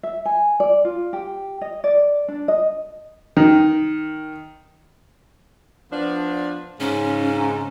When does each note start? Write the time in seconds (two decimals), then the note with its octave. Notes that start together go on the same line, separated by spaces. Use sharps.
0.03 E5
0.25 G#5
0.60 D5
0.85 F4
1.13 G4
1.61 D#5
1.84 D5
2.28 D4
2.48 D#5
3.37 D#3
5.92 F3 B3 D4
6.80 G#2 C#3 C#4